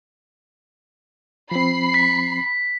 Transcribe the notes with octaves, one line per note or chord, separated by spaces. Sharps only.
F3 C4 B5 C7
B6